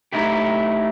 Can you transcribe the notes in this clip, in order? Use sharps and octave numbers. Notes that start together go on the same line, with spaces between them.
A3 D#4 E4 G4